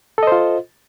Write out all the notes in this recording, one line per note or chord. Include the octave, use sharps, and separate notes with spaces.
F4 A4 C5 D#5